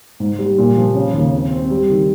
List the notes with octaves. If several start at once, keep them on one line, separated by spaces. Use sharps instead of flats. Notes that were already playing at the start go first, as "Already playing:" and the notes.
G#2
G3
A#2
F3
C#3
D#2
C4
C4
G3
D#3